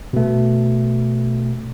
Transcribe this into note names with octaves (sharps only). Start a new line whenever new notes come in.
B2 A3